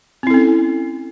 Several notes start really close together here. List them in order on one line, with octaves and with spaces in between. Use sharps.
C4 E4 A4 C#4